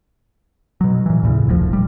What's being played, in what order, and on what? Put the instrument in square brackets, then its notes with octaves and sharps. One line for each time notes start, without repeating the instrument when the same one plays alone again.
[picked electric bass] B2 F#3
A#2 E3
D#2 A2 C#3
D#1 A#1 A2 F3
G3